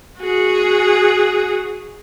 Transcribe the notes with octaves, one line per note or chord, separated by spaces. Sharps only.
F#4 G#4